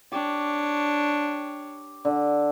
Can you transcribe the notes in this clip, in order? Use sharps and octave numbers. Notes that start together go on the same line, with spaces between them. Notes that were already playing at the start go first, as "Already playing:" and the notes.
D4 G4 C#5
D3